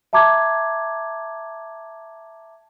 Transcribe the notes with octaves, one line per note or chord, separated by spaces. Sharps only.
E5 A5 A#5 D6 G#6